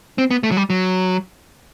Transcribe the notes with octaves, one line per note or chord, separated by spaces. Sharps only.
C4
B3
A3
F#3
G3
F#3